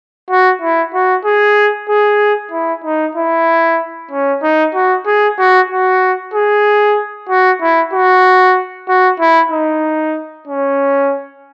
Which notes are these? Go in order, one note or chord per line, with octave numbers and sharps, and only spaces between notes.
F#4
E4
F#4
G#4
G#4
E4
D#4
E4
C#4
D#4
F#4
G#4
F#4
F#4
G#4
F#4
E4
F#4
F#4
E4
D#4
C#4